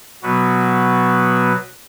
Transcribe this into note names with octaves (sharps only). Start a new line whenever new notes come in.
B2 F#3 B3 F#4 B4